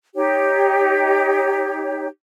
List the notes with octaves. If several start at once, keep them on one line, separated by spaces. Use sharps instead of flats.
D#4 G4 C#5